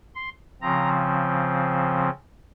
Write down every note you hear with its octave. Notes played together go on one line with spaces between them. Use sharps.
C6
C#3 F3 C4 A#5